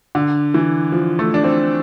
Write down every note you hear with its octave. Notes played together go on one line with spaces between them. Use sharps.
D3
E3
F3
A3
D4
C4